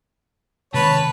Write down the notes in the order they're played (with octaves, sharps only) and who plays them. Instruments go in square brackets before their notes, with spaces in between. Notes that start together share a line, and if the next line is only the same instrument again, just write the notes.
[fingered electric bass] C3 D#3 G#3 [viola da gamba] B4 [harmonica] C#5 A5